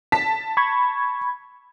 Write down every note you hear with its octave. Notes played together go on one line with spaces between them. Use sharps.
A5 B6
B5 C#6 G#6